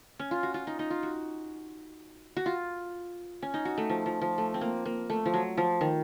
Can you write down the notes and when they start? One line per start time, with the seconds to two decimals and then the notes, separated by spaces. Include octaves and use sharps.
0.19 C#4
0.31 F4
0.43 F#4
0.54 F4
0.67 D#4
0.79 D#4
0.90 F4
1.03 F#4
2.37 F#4
2.46 F4
3.42 C#4
3.54 D#4
3.65 F#4
3.78 A3
3.90 F3
4.06 F3
4.22 F3
4.38 A3
4.54 C4
4.61 A#3
4.86 A#3
5.10 A3
5.26 F3
5.34 F#3
5.57 F3
5.81 D#3